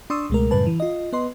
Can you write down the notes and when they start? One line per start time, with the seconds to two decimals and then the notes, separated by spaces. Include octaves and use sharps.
0.10 D4 C6 C#6 D#6 E6
0.30 C#2 B2 G#3 A3 A#4
0.51 F#2 A2 C#3 G3 B4 A5
0.66 E3
0.80 F4 D#5
1.13 B3 B4 D#5 C6